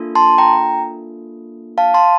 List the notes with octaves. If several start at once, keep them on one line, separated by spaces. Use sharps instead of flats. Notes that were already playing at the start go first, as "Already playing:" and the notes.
Already playing: A#3 D4 F4 A4
A5 C6
G5 A#5
F5 A5
A5 C6